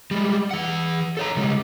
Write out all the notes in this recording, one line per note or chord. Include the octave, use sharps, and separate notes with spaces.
G3 G#3
E3 F#5
A4 C#5 A#5
C#3 G3 G#3